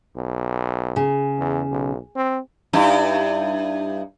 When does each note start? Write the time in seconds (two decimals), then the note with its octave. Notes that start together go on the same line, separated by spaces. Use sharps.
0.16 B1
0.96 C#3
1.38 E2
1.71 B1
2.16 C4
2.73 G2 D#4 E4